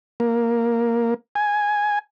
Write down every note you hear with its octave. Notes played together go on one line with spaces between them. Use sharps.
A#3
G#5